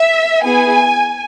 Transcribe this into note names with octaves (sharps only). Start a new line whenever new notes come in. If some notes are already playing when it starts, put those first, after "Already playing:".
Already playing: E5
B3 E4 G#4 G#5